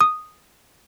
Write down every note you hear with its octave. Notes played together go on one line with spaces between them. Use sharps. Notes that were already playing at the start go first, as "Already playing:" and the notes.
D#6